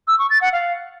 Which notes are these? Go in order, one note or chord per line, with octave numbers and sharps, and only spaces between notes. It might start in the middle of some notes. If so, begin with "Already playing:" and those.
E6
C#6
A6
F#5
F5